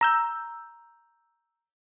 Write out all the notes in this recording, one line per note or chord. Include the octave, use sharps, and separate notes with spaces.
A#5 E6 G6